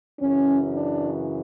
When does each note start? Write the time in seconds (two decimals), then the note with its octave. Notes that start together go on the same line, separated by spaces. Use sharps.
0.20 F#2 C#3 E3 C#4
0.73 D4